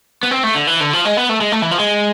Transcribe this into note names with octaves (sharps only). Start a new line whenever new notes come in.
B3
C4
A3
D3
E3
D3
F3
G#3
B3
A3
G#3
A3
E3
F3
G#3